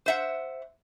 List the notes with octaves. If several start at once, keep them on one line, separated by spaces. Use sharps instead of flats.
C5 E5 F#5